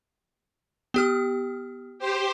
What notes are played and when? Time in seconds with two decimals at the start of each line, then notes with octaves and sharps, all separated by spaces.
0.94 B3 G4 F6
1.99 G4 C5